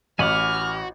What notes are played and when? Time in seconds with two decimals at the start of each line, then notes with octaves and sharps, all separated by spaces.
0.19 A1 F#4 G#5 B5 D6 F6